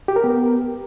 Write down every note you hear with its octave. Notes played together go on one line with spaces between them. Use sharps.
G4
A#4
B3